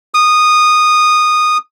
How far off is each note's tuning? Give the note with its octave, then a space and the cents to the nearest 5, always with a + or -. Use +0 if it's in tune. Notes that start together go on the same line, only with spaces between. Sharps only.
D#6 -15